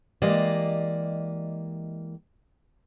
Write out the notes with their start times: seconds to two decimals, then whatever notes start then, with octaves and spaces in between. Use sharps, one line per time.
0.22 E3 G#3 A#3 G4 D5 D#5